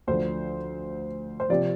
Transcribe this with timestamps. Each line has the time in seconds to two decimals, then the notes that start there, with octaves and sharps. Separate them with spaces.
0.07 D2 D3 F3 C5
1.40 C5
1.49 C3 F3 D5